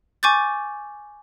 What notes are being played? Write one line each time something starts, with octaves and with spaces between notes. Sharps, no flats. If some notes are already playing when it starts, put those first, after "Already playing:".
G#5 C#6 D6 G6 A6